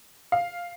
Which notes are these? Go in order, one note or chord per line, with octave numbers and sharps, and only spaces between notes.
F5